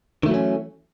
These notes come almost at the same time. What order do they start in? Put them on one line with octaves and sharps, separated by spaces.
D#3 A3 F#3 E3 C#4